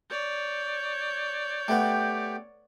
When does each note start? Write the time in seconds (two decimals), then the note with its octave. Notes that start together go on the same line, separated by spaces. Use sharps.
0.10 C#5 D5 G6
1.68 A3 B3 G4 G5